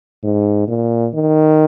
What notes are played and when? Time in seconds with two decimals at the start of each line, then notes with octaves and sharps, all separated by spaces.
0.23 G#2
0.68 A#2
1.14 D#3